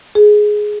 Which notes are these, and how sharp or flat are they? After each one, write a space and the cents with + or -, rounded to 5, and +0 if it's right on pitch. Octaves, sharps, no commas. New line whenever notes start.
G#4 +10